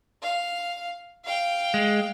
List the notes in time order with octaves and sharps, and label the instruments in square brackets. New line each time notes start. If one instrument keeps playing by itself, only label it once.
[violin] F5
F5 G5
[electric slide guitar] G#3